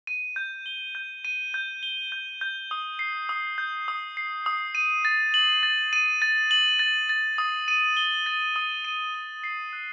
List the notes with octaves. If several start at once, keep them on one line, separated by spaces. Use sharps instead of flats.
D#7
G6
G7
G6
D#7
G6
G7
G6
G6
D#6
C7
D#6
G6
D#6
C7
D#6
D#7
A6
F#7
A6
D#7
A6
F#7
A6
A6
D#6
D#7
G7
A6
D#6
D#7
G7
C7
F#6